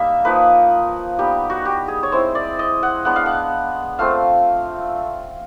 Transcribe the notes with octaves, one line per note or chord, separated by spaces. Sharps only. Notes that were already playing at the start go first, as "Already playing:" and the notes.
Already playing: G3 A#3 D#4 E5
F3 A#3 D#4 B4
G3 B3 D#4 G4
F#4
G4
G#4
C#5
G#3 C4 E4 C5
D5
D#5
F#5
G#3 B3 D4 F#5
F5
F#5
A3 C4 F4 F5